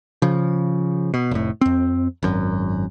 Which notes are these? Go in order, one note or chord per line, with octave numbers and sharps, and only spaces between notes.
C#3 F3
B2
F1 A2
F2 C4
G#1 F#2